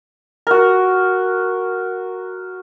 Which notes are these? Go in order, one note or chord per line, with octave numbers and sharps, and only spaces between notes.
F#4 A#4